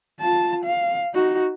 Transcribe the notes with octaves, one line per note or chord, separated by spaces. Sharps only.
F4 A5
F5
D#4 F#4